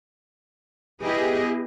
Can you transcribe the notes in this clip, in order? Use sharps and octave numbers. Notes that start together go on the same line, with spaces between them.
B3 E4 G4 G#4 B4 D#5